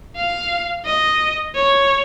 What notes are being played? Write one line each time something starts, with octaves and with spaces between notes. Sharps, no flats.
F5
D#5
C#5